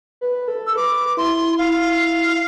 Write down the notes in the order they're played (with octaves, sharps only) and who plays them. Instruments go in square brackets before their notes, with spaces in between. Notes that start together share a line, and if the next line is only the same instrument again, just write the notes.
[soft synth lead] B4
A4
[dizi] E6
[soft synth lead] B4 [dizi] D6
[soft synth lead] E4 [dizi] C6
[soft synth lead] E4 [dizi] F5